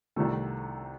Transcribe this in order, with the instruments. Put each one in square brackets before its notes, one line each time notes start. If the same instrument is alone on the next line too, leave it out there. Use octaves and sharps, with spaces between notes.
[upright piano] C2 C3 D#3 A3 A4